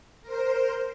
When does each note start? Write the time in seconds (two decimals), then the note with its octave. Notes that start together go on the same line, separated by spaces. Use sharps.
0.22 A#4 C5